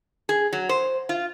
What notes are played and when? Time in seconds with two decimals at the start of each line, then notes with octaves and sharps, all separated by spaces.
0.29 G#4
0.53 F#3
0.69 C5
1.09 F4